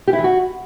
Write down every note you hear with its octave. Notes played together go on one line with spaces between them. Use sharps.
G4
E4
E3
F#4